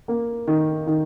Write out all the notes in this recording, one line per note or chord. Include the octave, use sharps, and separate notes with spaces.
A#3
D#3
D#3